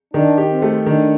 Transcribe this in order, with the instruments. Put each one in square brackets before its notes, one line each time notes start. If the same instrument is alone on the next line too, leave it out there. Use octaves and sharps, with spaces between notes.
[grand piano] D#3 [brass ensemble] D4
[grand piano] G4
[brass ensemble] C4
[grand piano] A3
[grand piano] D#3 [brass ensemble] D4